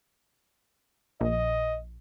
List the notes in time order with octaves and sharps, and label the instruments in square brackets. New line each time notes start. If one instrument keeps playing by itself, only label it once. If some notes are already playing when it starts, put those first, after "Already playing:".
[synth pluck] A#1 [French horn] D#5